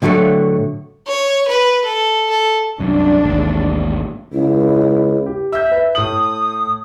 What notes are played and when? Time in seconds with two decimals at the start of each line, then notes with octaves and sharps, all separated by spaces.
0.02 A2 D3 F#3 G3 A3
1.07 C#5
1.48 B4
1.85 A4
2.30 A4
2.79 C2 F#2 D4
3.24 A1 D#2 G#2
4.33 C#2 E4
5.26 G4
5.52 E5 E6 G6
5.72 B4
5.95 A2 D#6 F#7